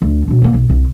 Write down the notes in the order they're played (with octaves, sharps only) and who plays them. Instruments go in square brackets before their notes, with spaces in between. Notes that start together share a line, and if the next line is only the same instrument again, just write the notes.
[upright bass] D2
B2 D4
A#3 B3
B1
C2